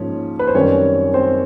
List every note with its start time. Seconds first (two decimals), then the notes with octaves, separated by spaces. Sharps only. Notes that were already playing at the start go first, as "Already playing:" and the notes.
Already playing: G#2 F3 A#3 C#4
0.39 B4
0.47 C5
0.55 F#2 D#3 G3 C4 C#4 C#5
1.14 C4 C5